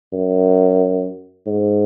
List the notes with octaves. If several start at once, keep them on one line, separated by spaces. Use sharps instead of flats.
F#2
G#2